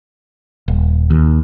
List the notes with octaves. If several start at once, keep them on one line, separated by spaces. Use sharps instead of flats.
D#1
D#2